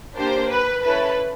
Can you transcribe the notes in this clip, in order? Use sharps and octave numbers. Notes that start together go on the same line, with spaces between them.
A#3 D4 G4 C5
B4
C#4 E4 A4 B4